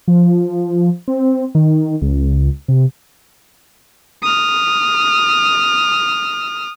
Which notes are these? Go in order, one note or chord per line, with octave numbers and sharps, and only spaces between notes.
F3
C4
D#3
C#2
C3
D#6 F6